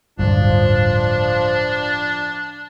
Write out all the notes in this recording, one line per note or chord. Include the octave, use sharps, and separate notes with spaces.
D1 G1 G2 F3 D4